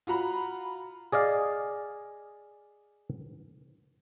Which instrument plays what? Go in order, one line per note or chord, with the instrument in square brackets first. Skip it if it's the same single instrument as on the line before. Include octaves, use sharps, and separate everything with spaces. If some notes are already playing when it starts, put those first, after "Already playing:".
[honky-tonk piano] F4 F#4 A#5 B5
[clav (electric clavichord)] G#4 D5 D#5 F5